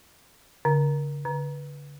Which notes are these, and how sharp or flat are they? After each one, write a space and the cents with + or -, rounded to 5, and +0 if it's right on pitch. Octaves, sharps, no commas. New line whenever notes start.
D3 -40
D3 -35